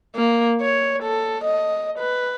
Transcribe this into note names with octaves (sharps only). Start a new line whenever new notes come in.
A#3
C#5
A4
D#5
B4